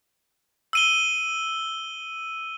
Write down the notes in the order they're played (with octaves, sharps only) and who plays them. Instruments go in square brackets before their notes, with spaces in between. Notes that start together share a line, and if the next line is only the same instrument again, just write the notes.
[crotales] E6 D#7 G7